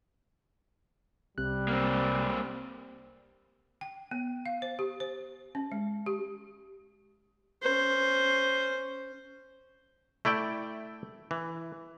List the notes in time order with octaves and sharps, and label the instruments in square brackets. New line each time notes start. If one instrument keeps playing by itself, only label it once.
[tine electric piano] C2 C3 F#6 [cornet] G3
[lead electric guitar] A#3 C4
[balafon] G5
B3
F5
C5
G4
C5
C#4
G#3
G4
[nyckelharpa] C#4 C5
[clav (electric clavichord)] A3 E4 D5 G5
E3